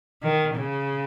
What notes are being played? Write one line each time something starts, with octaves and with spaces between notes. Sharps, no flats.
D#3
C#3